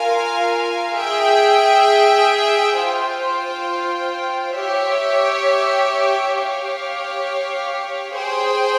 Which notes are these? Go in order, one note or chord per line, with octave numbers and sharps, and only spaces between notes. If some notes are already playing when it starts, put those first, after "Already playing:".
Already playing: F4 A#4 F5 G#5
G#4 E5 G5
F4 C5 G5
G4 C#5 E5
G4 C#5 F5
G#4 C5 G5